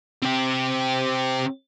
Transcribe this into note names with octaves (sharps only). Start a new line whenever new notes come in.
C4 G4